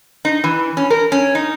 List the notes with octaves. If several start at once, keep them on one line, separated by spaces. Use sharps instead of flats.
D#4
E3
C#4
A#4
C#4
D#4